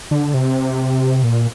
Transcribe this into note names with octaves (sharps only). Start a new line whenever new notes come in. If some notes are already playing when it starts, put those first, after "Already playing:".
D3
C3
A#2